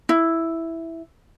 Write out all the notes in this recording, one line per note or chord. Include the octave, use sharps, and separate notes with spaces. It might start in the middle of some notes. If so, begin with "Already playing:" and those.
E4